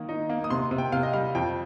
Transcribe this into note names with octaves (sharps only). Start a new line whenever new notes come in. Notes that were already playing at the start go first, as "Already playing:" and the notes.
Already playing: D#3 A#3 D#6
D#4
A#3
D#6
C3 C6
C3
G5
C3 F5
D#5
G3 F5
F2 G5